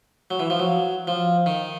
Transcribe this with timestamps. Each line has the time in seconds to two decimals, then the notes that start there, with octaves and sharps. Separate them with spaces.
0.31 F#3
0.40 E3
0.50 F3
0.60 F#3
1.07 F3
1.46 D#3